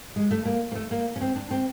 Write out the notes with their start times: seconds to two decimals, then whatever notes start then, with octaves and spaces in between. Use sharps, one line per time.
0.16 G#3
0.31 A3
0.45 A#3
0.72 A#3
0.75 A3
0.91 A#3
1.16 C#4
1.21 C4
1.36 D4
1.51 C4